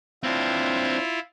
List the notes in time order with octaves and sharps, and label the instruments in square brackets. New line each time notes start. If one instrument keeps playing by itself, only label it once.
[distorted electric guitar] C4 D4 [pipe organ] E4 F4